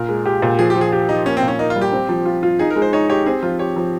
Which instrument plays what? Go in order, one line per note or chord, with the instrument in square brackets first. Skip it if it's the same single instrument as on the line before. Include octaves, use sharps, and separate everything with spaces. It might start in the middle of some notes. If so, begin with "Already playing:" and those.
Already playing: [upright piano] A#2 F4 [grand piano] A#4
[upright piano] G#3
G4
A#2
[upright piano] F3 [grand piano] G#4
[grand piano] G4
[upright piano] F3
[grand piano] G#4
[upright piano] G4
[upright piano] F3 [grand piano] D#4
[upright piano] A#3 [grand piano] C#4
[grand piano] C4
[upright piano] A#2
[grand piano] C#4
[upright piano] A#3 [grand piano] D#4
[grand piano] F4
[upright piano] G3
[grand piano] G4
[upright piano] C4
F3
F4
F4
[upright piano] D#4 [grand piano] G#4
[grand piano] A#4
[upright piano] G#3
[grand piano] C5
[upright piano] D#4 [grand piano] C#5
[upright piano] G4 [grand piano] C#5
[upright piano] C4 [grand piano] G#4
[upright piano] F3 [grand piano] F4
[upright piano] G4 [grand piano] C#5
[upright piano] F3